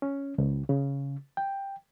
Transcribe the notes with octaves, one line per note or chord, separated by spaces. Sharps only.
C#4
C#2
C#3
G5